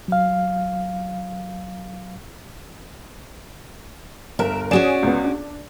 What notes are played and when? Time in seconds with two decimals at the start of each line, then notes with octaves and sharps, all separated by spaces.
0.08 F#3 F5
4.39 G1 A#4 E5
4.71 C#4 F#4 G#4 D5 E7
5.03 C#2 B3
5.24 D4